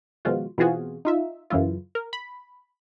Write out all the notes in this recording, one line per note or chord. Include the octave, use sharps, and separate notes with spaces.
B2 D#3 F3 G#3 F4 F#4
B2 E3 C4 F4 F#4 G#4
D#4 F4 E5
F#2 C#3 E3 E4 F4
A#4
B5